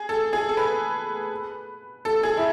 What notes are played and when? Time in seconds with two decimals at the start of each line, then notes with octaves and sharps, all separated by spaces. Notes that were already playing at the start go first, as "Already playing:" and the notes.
Already playing: G#4
0.09 A4
0.33 G#4
0.49 A4
0.57 B4
2.05 A4
2.23 G#4
2.37 E4